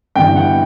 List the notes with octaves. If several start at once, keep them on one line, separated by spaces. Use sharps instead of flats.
G1 G2 E3 G5
F#5